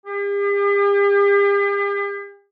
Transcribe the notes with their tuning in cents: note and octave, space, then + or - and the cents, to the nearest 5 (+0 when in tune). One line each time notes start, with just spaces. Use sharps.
G4 +45